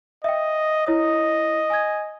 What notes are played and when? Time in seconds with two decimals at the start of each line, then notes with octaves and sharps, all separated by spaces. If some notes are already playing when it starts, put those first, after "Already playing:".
0.24 D#5 E5 G5
0.86 E4 C#5 D#5 D#6
1.70 G#5 D#6 G#6